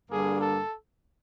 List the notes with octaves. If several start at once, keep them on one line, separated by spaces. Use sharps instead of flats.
G2 D3 G3 A#3 G#4
A4